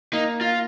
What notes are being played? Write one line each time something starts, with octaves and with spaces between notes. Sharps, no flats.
A#3 D#4
F4